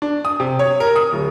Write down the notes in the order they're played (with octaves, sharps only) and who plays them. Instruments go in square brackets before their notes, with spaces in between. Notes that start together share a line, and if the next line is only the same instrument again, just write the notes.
[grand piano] D4
D#6
C3
C#5
A#4
D#6
D1